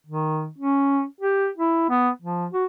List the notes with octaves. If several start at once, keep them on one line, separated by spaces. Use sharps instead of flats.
D#3
C#4
G4
E4
B3
F3
F#4